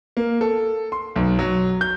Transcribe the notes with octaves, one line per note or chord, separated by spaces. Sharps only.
A#3
A4
C6
B1
F#3
G6